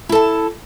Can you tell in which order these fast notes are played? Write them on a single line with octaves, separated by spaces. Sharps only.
E4 A4 A5